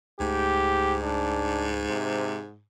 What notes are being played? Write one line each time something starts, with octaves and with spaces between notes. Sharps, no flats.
C#2 G#2 A3 G4
D4
C3